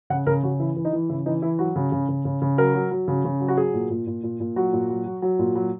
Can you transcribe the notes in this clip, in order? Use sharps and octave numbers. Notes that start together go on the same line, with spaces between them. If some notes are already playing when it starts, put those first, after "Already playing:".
C#3 F#5
C#3 A#4
C#3 F#4
E3 E4
E3
D#4
E3
C#3 E4
E3 D#4
E3 E4
F#3 F#4
C#3
C#3
C#3
C#3
C#3
F#3 A#4
F#3
F#3
C#3
C#3
F#3
F#4
F#3 G#4
A#2
A#2
A#2
A#2
A#2
F#3 F#4
A#2
F#3
F#3
F#3
A#2
F#3